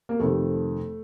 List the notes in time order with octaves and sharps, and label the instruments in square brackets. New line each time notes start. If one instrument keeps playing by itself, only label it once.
[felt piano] A#3
F2 C3 D#3 A3